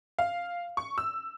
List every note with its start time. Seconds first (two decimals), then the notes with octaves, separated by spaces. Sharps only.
0.19 F5
0.77 C#6
0.98 E6